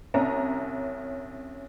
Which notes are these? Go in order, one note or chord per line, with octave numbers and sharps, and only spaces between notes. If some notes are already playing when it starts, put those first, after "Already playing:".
C2 C#4 A#5